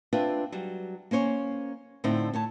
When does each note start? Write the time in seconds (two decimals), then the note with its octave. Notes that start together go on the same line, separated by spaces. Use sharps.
0.13 C4 D4 F4 B4 E5
0.52 F#3 G3
1.11 A#3 C#4 C5 C#5
2.04 A2 D3 C4 D#4 E4
2.33 A2 C#5 A5